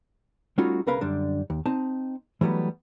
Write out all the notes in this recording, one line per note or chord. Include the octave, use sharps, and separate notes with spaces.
G3 A3 C#4 D#4 F4 F#4
C2 C#3 A#4 B4 F5 B5
F#2 D3 G3 D4
D#2
C4 D#4 A5
E3 F#3 G3 A3 B3